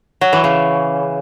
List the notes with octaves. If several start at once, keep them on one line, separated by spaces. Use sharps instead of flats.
F#3
E3
C#3